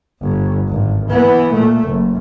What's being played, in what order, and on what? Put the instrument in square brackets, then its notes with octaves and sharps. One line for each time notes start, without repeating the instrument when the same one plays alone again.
[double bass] G1
G#1
E3 B3
A#2 A3
F#1